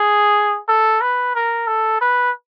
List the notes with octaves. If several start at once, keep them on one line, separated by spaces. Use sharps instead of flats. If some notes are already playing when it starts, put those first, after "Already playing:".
Already playing: G#4
A4
B4
A#4
A4
B4